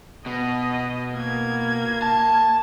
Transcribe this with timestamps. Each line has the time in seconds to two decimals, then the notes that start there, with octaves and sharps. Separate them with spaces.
0.26 B2 D#5
1.14 A#3 G#6
2.02 A5